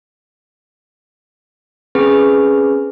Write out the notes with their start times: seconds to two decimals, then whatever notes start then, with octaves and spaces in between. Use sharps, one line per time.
1.95 C4 C#4 G#4 B4